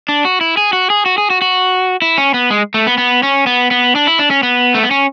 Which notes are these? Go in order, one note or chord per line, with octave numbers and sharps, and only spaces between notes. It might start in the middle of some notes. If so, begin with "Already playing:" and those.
D4
F#4
E4
G#4
F#4
G#4
F#4
G#4
F#4
F#4
E4
C#4
B3
G#3
A3
B3
B3
C#4
B3
B3
D4
E4
D4
C#4
B3
A3
B3
C#4